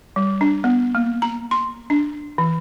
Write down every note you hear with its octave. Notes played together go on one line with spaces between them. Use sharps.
G3
D4
B3
A#3
A#5
C6
D4
E3